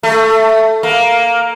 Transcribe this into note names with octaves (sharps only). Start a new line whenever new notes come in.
A3
A#3